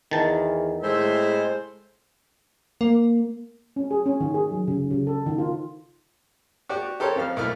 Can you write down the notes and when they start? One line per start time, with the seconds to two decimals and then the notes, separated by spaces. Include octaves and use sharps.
0.11 E2 D#3 A5
0.82 A2 C3 G#3 C5 E5
2.81 A#3
3.76 C#4
3.91 G#4
4.06 C#4
4.20 D#3
4.34 G#4
4.51 F#3
4.68 C#3
4.90 C#3
5.07 A4
5.26 D#3
5.38 F4
6.69 F#4 G4 D5
7.00 G4 A4 A#4 C5 C#5
7.16 F2 F3 F5 F6
7.36 B1 A3 A#3 E4 F6